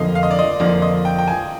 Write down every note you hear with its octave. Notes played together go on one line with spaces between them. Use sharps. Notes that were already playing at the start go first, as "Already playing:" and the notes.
Already playing: F2 D3 F3 A#3 D#5 F5
F5
D#5
D5
D#5
F2 D3 F3 A#3 D5
D#5
G5
G5
G#5